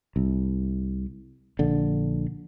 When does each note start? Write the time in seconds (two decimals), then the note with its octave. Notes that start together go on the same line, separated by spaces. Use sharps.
0.16 C2
1.59 A#1 D3